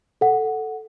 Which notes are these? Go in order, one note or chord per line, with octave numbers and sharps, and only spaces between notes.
A4 F#5